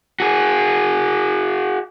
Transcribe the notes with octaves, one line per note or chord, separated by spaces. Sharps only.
F#4 G#4